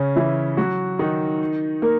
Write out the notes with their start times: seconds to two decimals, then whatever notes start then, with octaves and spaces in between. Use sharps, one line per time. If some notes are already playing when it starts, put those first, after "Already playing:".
Already playing: C#3 C#4
0.16 E3 E4
0.57 F#3 F#4
0.99 D#3 D#4
1.82 A#3 A#4